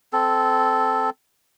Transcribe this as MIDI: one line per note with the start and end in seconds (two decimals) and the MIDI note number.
0.13 1.10 60
0.13 1.10 69